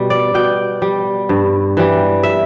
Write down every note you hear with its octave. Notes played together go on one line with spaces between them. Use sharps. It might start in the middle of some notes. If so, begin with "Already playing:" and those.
Already playing: B2 G3
D5
B2 G5
G3
G2
E3 G3
E5